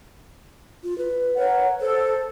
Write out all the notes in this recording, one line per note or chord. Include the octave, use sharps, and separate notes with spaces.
F4
B4
A#4 C#5 F#5
A4 C5